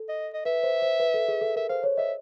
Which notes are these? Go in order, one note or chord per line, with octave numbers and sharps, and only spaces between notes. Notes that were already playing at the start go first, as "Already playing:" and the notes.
Already playing: A4
D#5
D#5
B4 E5
C5
C5
B4
A4
G#4
A4
A#4 E5
C5 F5
C#5
D#5 E5